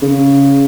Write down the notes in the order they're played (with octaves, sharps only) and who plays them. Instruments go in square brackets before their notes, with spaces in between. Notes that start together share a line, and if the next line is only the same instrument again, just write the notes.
[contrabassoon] C#3